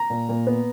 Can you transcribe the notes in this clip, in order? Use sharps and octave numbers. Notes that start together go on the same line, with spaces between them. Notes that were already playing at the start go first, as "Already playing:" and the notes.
Already playing: A#5
A#2
A#2
B3